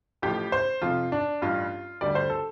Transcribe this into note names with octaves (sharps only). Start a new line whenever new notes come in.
A1 A2 F3 G4
C5
F2 C3 F3 F4
D4
A1 G2 G3 F4
D2 D3 G3 D5
C5
A4